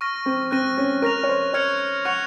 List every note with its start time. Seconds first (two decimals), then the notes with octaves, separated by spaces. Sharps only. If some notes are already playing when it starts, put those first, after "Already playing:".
0.01 C#6 F6 A#6 D#7
0.26 C4
0.51 C4 F#6 A#6 D#7
0.77 C#4
1.02 A#4 C#6 F#6 A#6 F7
1.23 C#5
1.29 C5
1.53 C#5 F6 G#6 C#7 F7
2.05 F#5 C#6 F#6 C#7 F7